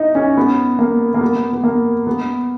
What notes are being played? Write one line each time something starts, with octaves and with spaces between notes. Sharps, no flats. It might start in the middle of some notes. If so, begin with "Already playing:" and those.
Already playing: D#4 E4
C#4
B3
A#3
A#3
B3
B3
A#3
B3